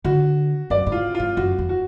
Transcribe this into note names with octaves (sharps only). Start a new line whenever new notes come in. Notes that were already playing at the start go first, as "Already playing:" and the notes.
D3 F#4
F#2 D5
G#2
F4
G#2 F4
F#2 F#4
F2
F#4